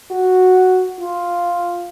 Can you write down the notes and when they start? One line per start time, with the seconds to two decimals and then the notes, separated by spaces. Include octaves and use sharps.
0.11 F#4
1.00 F4